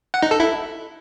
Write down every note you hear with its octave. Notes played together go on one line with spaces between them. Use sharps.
F#5
D#4
A4
E4